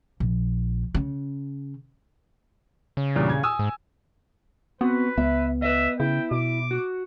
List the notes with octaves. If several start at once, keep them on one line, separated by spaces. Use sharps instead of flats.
A#1
C#3
C#3
E2 G2 A#2
G#6
G#5 D#6 E6
G#2
B3 C4 F#4 B4
C#2 B3 E5
B4 D#5 E5
C#3 E4 G5
B2 D6
F#4